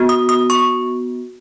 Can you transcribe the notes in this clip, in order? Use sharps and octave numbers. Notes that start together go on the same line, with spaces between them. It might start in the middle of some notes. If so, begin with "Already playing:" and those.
Already playing: B3 F#4
D#6
D#6
C#6